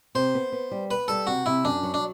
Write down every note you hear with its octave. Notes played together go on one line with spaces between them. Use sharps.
C3 C5
B3
B3
G3
B3 B4
G3 A4
C3 F#4
C3 E4
F#2 D4
F#3
D4